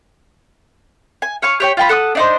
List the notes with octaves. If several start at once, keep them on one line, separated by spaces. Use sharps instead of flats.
G#5
C#5 F5 G#5 C#6
G4 C#5 G5
F4 G5 B5
A4 F#5 C#6 D#6
D4 D#4 C5